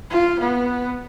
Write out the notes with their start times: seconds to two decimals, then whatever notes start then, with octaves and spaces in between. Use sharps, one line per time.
0.10 F4
0.40 B3